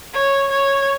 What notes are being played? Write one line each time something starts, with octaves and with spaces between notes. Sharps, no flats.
C#5
C#5